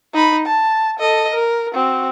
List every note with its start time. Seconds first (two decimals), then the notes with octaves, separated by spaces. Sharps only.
0.14 D#4 B5
0.46 A5
0.99 A4 D#5
1.34 A#4
1.75 C4 F#4